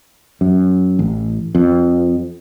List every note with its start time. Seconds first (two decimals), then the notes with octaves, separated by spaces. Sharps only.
0.41 F#2
0.99 A1
1.55 F2